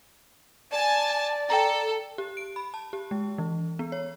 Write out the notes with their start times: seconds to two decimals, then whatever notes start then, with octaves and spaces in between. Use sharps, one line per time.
0.72 D5 G#5 A5
1.50 A4 G5 A#5
2.18 G4
2.37 D7
2.56 B5
2.74 A5
2.93 G4
3.11 G#3
3.38 E3
3.79 B3
3.92 C#5